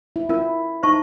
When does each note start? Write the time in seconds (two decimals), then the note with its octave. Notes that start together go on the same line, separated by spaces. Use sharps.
0.16 E4
0.29 C#4 E4 F4 A#4
0.83 D#4 C5 E5 A5 C#6